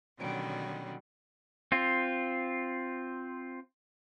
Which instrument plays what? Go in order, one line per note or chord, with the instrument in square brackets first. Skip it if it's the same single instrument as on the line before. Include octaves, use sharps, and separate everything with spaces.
[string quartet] B2 D3 D#3 F#3 G3 C#4
[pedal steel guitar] C4 F4